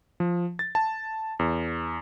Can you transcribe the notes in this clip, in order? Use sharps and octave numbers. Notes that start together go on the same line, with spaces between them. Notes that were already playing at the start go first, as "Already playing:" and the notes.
F3
A6
A5
E2